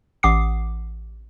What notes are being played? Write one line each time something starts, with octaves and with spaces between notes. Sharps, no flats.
A1 F#5 D6 D#6 C7